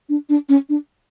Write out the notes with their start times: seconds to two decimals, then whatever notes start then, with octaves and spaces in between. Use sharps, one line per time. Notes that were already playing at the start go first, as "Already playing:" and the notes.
0.09 D4
0.29 D4
0.49 C#4
0.69 D4